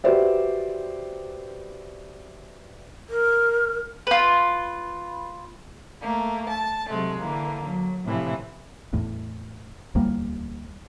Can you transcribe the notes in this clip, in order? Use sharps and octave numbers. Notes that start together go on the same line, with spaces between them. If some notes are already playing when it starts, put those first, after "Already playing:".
F#4 G4 B4 C5 D5 E5
A#4
F4 B4
A3 A#3
A5
C3 F#3 G#3 A3
D3 E3 A#3
F#3
A2 C3 E3 F3
E2 A2
D1 E2 G3 A#3